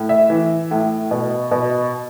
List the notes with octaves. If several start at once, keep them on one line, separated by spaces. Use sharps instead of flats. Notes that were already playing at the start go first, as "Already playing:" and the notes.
Already playing: A2
E5
E3
A2
B2
B2